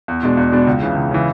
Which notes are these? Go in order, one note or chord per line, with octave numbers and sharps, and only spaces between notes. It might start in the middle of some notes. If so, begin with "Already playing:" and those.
E2
B2 G#3 D4
E2
B2 G#3 D4
C#2
C#3 E3
C#2
C#3 E3